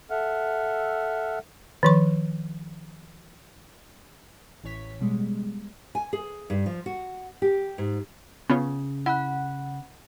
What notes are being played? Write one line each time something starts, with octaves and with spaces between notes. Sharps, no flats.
A4 E5 F#5 F6
D#3 F3 C#6
A1 E3 C#5 B6
B2 G3 G#3
G#5
G#4
G2
F3
F#4
G4
G#2
C#3 B3 F4 C#5
E4 F#5 B5 F#6